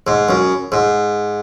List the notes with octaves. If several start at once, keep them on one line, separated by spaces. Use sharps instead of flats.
G#2
F#2
G#2